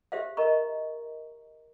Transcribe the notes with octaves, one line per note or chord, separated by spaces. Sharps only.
G4 G#4 C5 E5 F5
A#4 D#5 A#5 C#6